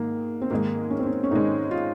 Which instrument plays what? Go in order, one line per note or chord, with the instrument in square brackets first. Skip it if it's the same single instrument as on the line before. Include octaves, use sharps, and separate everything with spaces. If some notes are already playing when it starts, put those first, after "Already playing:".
Already playing: [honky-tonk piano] G#2 D#3 [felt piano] A#3
[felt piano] C4
[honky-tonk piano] G#2 D#3 G#3 [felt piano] A#3
[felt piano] C#4
C4
C#4
C#4
[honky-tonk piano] G#2 D#3 G#3 [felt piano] D#4
[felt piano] F4